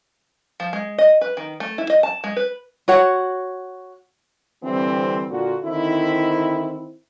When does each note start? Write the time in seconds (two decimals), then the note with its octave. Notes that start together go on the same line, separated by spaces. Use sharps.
0.60 F3
0.73 G#3
0.98 D#5
1.21 B4
1.37 D#3
1.60 A3
1.78 E4
1.90 D#5
2.03 A5
2.24 G#3
2.36 B4
2.88 F#4 C#5 F#5
4.63 D3 E3 G3 C4
5.30 A#2 D3 F4 F#4
5.64 D3 D#3 C4 E4